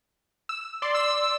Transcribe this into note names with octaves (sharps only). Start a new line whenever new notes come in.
E6
D5 C6
E6